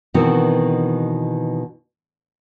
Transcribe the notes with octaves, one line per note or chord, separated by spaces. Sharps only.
B2 D#3 E3 C4 F#4